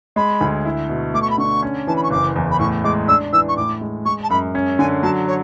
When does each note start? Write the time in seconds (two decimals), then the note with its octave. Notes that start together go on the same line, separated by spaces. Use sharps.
0.16 G#3 B5
0.41 D2
0.65 E4
0.89 B2
1.14 A3 D6
1.22 C#6
1.30 B5
1.38 D3 C#6
1.62 C#4
1.87 E3 A5
1.96 B5
2.03 C#6
2.11 F#1 D6
2.36 E2
2.51 B5
2.59 A2 C#6
2.84 G#3 D6
3.08 D4 E6
3.33 E3 E6
3.48 C#6
3.57 A2 D6
3.81 G#3
4.05 G#3 C#6
4.23 A5
4.30 F#2 B5
4.55 C#4
4.79 D3 G#5
5.03 F#3 A5
5.27 C#5